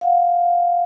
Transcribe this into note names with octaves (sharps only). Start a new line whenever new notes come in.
F5 F#5